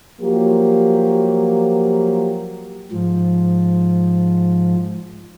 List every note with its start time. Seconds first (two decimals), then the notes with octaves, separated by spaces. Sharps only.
0.21 F3 F#3 A#3 F4 G4
2.92 G#2 F3